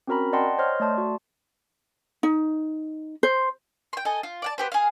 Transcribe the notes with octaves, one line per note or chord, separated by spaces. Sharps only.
C4 C#4 F#4 A#4 A#5 B5
D5 D#5 F#5 G5 A5 C6
C5 C#5 D#5 C6 F6
A3 D5 A5 C6
F#4
D#4
C5
G5 C6
A4 D#5 G#5
F4
D5 F#5 A5
B3 G4 C5
G#4 F5